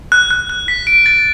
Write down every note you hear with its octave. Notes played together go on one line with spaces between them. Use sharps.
F#6
F#6
F#6
B6
D7
A6